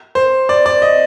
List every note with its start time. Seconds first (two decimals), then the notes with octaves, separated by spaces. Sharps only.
0.15 C5
0.49 D5
0.66 D5
0.82 D#5